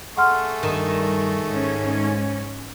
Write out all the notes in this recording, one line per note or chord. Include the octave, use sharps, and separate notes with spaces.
A3 G#4 F#5 C6 C#6 F6
G2 D#3 G3
G#2 C#4